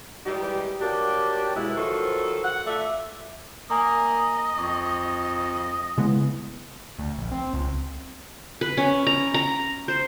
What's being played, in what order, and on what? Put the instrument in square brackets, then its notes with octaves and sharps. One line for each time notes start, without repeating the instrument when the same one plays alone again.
[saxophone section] G#2 E3 G3 D#4 G4
F#3 A#3 D4 G4
B2 G#3 E4
D#3 F3 F#3 F#4 A4 C5
F#5
A3 F4 D5 E5
[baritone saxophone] A#3 [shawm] D#5 [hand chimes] G#5 A#5 D#6
[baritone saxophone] F2 [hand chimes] C#6 D6
[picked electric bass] C#3 G#3 B3 [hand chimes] E4
[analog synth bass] D2
A#1
C4
C#2
[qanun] B4
C#4
A#5
A#5
C5